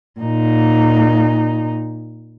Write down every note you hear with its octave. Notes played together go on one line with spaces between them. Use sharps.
A#2 D#4